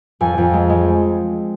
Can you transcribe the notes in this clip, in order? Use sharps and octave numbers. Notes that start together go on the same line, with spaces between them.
F2 G#5
F2
G#3
G#3